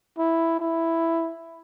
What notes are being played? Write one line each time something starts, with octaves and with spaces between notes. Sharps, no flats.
E4
E4